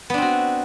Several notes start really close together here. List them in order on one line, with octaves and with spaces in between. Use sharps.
B3 D4 C4 F#4